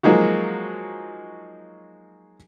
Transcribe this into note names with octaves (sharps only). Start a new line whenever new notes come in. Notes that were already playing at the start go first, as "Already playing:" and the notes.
F3 F#3 G#3 A#3 D#4 F#4